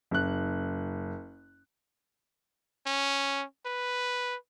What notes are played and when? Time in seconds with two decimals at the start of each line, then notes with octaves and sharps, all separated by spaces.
0.11 F#1 F#6
2.86 C#4
3.66 B4